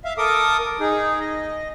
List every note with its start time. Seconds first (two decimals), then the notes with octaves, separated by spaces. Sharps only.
0.05 E5 F5
0.18 A4 A#4 D6 D#6
0.80 D#4 G#4
1.20 D#5